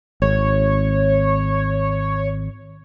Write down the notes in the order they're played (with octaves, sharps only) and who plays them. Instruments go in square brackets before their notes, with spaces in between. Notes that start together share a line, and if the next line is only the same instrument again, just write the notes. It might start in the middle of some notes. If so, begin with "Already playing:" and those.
[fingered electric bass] G#1 [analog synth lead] C#5